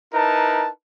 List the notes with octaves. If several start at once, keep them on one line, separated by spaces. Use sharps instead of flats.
D#4 E4 A#4 B4 A5